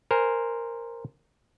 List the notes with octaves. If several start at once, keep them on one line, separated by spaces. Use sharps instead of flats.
A#4 C5 G#5